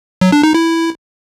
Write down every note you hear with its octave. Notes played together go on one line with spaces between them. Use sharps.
F#3
D4
D#4
E4